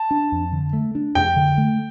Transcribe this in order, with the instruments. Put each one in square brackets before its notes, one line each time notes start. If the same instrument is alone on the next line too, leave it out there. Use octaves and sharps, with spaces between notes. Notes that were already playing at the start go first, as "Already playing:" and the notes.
Already playing: [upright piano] A5
[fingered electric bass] D4
F2
D3
A3
D4
[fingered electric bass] F2 [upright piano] G5
[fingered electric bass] D3
A3